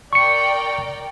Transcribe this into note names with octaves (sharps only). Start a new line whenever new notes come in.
A#4 D5 G5 C#6 C#7